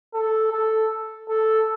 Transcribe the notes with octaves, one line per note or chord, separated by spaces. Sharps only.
A4
A4
A4